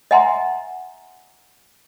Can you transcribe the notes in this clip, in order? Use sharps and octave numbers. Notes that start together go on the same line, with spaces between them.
D#5 E5 F#5 G#5 A#5 C6